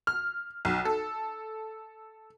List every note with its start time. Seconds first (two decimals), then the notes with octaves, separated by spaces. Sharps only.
0.07 F6
0.65 B1
0.85 A4